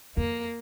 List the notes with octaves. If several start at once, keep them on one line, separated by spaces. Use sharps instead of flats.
F2 A#3